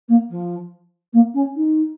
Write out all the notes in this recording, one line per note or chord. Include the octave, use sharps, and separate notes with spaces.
A#3
F3
A#3
C#4
D#4